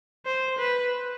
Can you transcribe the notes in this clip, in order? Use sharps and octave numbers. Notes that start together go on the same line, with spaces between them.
C5
B4